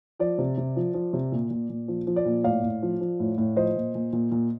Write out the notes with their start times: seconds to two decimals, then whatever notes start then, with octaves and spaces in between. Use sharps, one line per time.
0.20 F3 D5
0.38 C3
0.58 C3
0.76 F3
0.94 F3
1.13 C3
1.32 A#2
1.50 A#2
1.69 A#2
1.88 F3
2.07 F3
2.16 D5
2.25 A#2
2.44 A2 D5 F5
2.63 A2
2.82 F3
3.01 F3
3.20 A2
3.38 A2
3.56 F3 C5 D#5
3.76 A#2
3.95 A#2
4.13 A#2
4.32 A#2